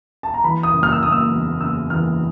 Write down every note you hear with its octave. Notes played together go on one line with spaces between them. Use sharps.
A5
A#5
E3 B5
D#6
F#1
F6
E6
F#1 D#6
E6
E2
C#3 E6
E3 F6